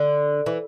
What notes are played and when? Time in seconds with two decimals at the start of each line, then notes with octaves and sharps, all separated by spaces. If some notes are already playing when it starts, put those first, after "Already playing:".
Already playing: D3
0.46 E3